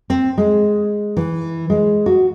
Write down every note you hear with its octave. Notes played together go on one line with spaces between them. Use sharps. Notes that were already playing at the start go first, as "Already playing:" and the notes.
C4
G#3
E3
G#3
F#4